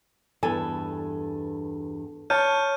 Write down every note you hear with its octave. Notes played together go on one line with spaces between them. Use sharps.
E2 G2 A4 G#5
C#5 A5 F6 G6 D#7